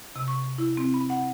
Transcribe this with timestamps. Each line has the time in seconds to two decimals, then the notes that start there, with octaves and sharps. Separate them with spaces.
0.16 C3
0.28 C#6
0.58 E4
0.77 C4
0.94 B5
1.10 F#5